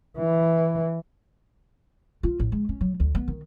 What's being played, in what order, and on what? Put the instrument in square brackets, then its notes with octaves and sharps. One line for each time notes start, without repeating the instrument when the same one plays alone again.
[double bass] E3
[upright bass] F4
A1
G#3
C#4
F#3
D2
B3
D#3